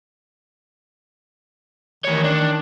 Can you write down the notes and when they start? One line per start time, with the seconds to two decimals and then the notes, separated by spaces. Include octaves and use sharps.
2.04 D#3 E3 C#5
2.24 D4